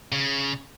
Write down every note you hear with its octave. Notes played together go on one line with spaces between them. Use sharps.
C#3